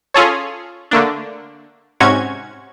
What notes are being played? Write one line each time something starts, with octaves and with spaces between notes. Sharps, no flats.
C#4 F4 G#4 A4 C#5
D3 A3 A#3 D4
G#2 C3 C#4 F#4 C#6 G#6